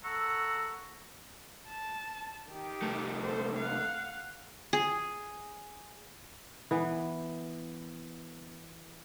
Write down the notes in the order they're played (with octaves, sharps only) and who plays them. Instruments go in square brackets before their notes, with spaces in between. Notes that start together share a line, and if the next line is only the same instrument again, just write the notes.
[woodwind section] A4 F#5 A#5 C#6 E6
[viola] A5
D#3 G4
[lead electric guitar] C2 A3
[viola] A4 C5
F5 F#5
[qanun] G#4
[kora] E3 B3